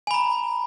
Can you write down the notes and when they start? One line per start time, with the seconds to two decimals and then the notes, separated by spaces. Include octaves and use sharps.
0.07 G#5
0.11 B5
0.14 A#5